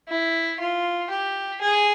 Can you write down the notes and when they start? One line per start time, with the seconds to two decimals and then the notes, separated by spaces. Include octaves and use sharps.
0.09 E4
0.60 F4
1.11 G4
1.61 G#4